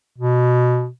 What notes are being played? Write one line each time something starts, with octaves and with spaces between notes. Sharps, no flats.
B2